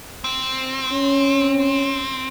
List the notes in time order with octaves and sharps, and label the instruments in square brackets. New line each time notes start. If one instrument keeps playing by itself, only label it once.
[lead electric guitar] C4
[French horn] C#4